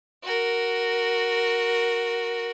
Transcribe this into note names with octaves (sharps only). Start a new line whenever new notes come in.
F#4 A#4